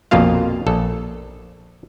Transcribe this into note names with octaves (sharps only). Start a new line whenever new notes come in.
A#1 F2 B2 A#3 F4 F5
A#1 A4